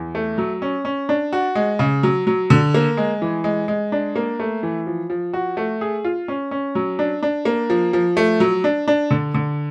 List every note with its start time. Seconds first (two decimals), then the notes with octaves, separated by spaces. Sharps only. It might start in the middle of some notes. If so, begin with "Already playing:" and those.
Already playing: E2
0.15 A3
0.38 F#3
0.62 C#4
0.85 C#4
1.09 D4
1.33 F#4
1.55 G#3
1.79 C#3
2.03 F#3
2.27 F#3
2.50 D3
2.74 A#3
2.97 G#3
3.22 E3
3.44 G#3
3.68 G#3
3.92 D4
4.16 A#3
4.40 A3
4.63 E3
4.86 F3
5.10 F3
5.33 F#4
5.57 A3
5.81 G#4
6.04 F4
6.28 C#4
6.51 C#4
6.75 F#3
6.99 D4
7.23 D4
7.45 A#3
7.70 F3
7.93 F3
8.17 A3
8.40 F#3
8.64 D4
8.88 D4
9.11 D3
9.35 D3